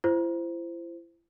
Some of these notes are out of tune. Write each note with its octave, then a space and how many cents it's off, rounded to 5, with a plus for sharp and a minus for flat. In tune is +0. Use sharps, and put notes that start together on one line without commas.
E4 +40 C5 -10